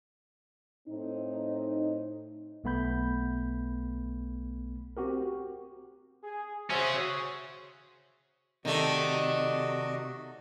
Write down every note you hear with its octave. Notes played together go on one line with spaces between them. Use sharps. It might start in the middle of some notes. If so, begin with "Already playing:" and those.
A2 C4 D#4
B1 A3 B3 B5 G6
C4 F#4 G4 A#4
G#4
C#4 F#4 G#4 C5 C#5 E5
C3 D#3 A3 F#4 D5 D#5